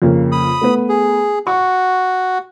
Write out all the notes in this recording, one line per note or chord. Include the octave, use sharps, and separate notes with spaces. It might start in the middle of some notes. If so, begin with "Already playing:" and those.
F2 C#3 A#3
B5 D#6
A3 B3 B4
G#4
F#4 C#6